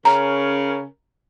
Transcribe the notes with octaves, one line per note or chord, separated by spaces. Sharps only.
C#3 C#4 A#4 A#5